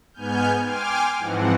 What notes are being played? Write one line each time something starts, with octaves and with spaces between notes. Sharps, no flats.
G#2 B3 G#5 F6 G6
G5 G#5 C6 D6 F6
G#2 E3 F3 C4 F#5